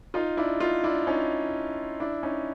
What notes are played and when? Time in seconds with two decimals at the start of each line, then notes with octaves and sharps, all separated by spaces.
0.14 D#4 F4
0.37 D4 E4
0.60 D#4 F4
0.84 D4 E4
1.07 C#4 D#4
2.00 D4 E4
2.23 C#4 D#4